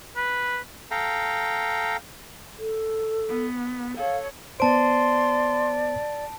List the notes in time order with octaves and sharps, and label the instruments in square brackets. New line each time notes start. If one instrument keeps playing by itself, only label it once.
[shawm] B4
[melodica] A4 F5 G5 A#5
[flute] A4
[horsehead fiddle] B3
[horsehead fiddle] A4 C#5 [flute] F5
[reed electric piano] B3 C5 [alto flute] D5 [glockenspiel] A5 D7 [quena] C6